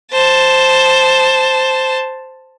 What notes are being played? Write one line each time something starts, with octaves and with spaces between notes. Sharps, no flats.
C5 A5